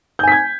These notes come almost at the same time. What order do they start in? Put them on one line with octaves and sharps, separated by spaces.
G6 G#5 B6 G#6